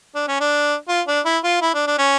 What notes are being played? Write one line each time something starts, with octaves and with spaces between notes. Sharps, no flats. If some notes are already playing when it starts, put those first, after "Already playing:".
D4
C#4
D4
F4
D4
E4
F4
E4
D4
D4
C#4